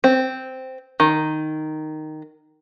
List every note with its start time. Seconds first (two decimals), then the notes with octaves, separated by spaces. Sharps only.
0.04 C4
1.00 D#3